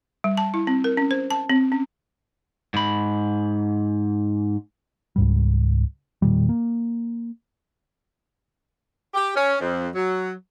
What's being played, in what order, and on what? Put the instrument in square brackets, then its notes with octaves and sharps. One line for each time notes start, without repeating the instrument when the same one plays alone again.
[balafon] G3
A5
E4
C4
A#4
C#4
C5
A5
C4
C#4
[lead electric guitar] G#2 B5
[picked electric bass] C#2 G#2 G3
E1 A#2 D#3 G3
A#3
[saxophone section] G4
C#4
F2
F#3